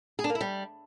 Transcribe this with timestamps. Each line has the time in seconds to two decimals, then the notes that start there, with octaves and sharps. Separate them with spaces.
0.19 G#4
0.24 D4
0.30 A#3
0.35 E4
0.41 G3